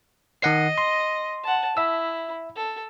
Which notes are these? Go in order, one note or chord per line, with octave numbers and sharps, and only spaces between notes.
D#3 D#5 F#5 C7
C6
F#5 A5
E4 E5 E6
A4